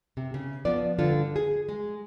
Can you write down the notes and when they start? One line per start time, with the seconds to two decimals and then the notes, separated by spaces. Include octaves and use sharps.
0.17 C3
0.34 C#3
0.65 F3 B3 D5
0.99 G2 D3 F4
1.36 G#4
1.69 G#3